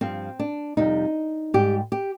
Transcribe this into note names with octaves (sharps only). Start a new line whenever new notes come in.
G2 F3 C4
D4
F2 C3 G3 D#4
G#2 G3 G4
G4